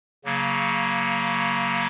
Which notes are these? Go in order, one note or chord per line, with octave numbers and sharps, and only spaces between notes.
C#3 F#3 A#3